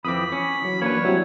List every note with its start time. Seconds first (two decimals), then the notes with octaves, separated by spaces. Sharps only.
0.05 F2 E3 C4 B5 D6 D#6
0.32 C#4
0.62 E3 F#3
0.81 A#3 D4 B4 C#5
1.05 F#3 G3 C4 E4